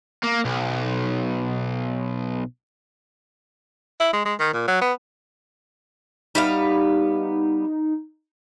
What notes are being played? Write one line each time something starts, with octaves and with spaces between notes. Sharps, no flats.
A#3
B1
E4
G#3
G#3
D#3
A#2
F#3
B3
G3 B3 D#4 F5